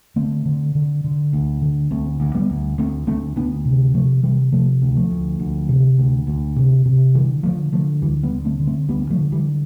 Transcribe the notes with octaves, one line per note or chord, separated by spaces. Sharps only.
D3 A3 C4
D3
D3
D3
D2
D3
D2 A3 C4
D2
G3 B3
D2
D2 A3 C4
D2 A3 C4
D2 B3 D4
C3
C3 F3 A3
C3 E3 G3
C3 F3 A3
D2
F3 A3
D2
D2
C3
D2
D2
C3
C3
D3 E3 G3
D3 F3 A3
D3 F3 A3
D2 E3 G3
G3 B3
D3
A3 C4
D3
A3 C4
D2 G3 B3
F3 A3
D3
E3 G3